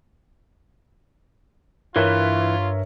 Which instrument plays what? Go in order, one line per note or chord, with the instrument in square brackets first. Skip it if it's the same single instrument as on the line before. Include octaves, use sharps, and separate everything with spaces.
[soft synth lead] G2 [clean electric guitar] E3 [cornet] F4 [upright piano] A#4 C#5 E5